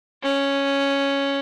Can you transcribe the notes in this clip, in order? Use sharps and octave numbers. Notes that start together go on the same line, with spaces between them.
C#4